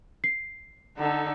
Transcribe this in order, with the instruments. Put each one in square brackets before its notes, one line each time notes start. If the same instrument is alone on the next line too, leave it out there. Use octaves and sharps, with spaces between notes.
[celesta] C7
[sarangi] D3 [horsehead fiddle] D#4 A4